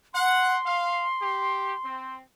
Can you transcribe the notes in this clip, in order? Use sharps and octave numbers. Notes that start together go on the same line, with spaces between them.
F#5 C6
F5
G4
C4